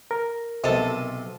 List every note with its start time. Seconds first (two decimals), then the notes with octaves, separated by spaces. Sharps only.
0.11 A#4
0.64 B1 C3 A4 D#5